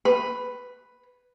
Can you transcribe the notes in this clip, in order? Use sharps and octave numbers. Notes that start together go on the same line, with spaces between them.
B4